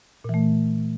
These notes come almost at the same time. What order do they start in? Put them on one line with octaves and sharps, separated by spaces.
A#2 E3 A3